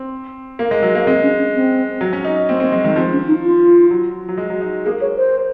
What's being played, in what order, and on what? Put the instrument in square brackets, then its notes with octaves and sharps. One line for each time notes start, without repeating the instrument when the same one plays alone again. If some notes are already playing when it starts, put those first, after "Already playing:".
Already playing: [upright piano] C4
A#3
G#3
F#3
A#3
[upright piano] G#3 [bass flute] C4
[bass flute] C#4
C#4
C4
[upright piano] F#3
C#4
D#4
D#4
[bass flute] A#3 [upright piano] C4
[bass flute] A#3 [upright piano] C4
[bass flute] F#3 [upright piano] G#3
[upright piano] D#3 [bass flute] G#3
[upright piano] F3 [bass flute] C4
[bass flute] C#4
D#4
F4
[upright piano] F#3
F#3
G#3
F#3
D#4
[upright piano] A#3 [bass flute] G#4
[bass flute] C#5
C5